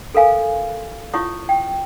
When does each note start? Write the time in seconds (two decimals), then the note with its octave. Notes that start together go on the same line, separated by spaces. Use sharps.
0.15 A4 A#4 F5 G#5
1.14 E4 F4 C#5 C#6 D#6
1.49 G5